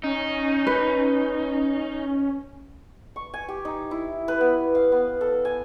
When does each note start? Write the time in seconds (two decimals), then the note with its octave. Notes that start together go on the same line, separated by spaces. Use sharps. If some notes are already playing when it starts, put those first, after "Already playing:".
0.03 C#4 D#4
0.67 B4
3.16 C#6
3.34 G#5
3.48 G4
3.65 D#4
3.91 E4
4.28 B4
4.41 B3
4.75 F5
4.92 B3
5.21 A4
5.45 G#5